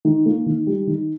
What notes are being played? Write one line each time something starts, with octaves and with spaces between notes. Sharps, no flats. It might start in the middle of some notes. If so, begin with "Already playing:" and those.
D#3
A#3
D#3
G3
D#3